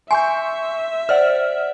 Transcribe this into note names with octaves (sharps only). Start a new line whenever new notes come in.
E5 G#5 C6 C#6 G6
C5 D5 F#5 F6